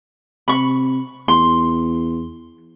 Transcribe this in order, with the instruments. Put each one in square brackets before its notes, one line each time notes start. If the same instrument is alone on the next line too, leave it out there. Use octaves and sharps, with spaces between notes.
[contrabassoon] C3 [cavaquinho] B5 C#6
[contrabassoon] E2 [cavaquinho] C6